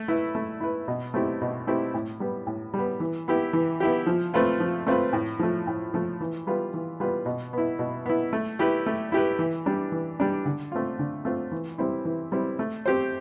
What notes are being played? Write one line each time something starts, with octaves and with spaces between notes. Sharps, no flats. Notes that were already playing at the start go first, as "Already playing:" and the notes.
Already playing: A3
E4 B4
A3
E4 B4
B2
A3 C4 E4 G4
B2
A3 C4 E4 G4
A2
G3 B3
A2
G3
B3
E3
B3 E4 G4
E3
B3 E4 G4
F3
A3 C4 F4 B4
F3
A3 C4 F4 B4
A2
F3 A3
A2
F3 A3
E3
G3 B3 F4 B4
E3
G3 B3 F4 B4
B2
B3 E4
B2
B3 E4
A3
E4 G4 B4
A3
E4 G4 B4
E3
G3 D4
E3
G3 D4
D3
A3 C4 F4
D3
A3 C4 F4
E3
G3 C4 E4
E3
G3 C4 E4
A3
C4 G4 C5